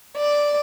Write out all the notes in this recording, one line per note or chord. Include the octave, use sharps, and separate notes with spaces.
D5